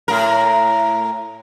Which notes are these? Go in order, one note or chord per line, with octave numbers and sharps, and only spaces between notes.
A2 A#4